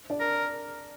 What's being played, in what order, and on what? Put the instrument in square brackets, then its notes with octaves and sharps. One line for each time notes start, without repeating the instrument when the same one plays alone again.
[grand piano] D4 D5
[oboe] A#4